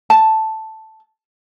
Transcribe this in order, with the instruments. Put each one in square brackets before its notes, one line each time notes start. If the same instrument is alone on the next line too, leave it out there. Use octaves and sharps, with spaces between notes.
[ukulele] A5